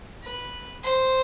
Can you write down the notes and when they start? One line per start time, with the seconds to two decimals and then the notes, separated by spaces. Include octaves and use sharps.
0.23 B4
0.83 C5